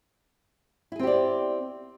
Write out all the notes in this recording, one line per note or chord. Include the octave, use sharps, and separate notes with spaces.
C4 E4 G4 G#4 D5